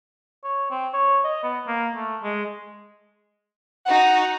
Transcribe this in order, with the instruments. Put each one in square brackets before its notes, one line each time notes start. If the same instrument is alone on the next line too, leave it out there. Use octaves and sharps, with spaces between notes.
[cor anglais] C#5
C4
C#5
D#5
B3
A#3
A3
G#3
[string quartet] D#4 F#4 [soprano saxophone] F#5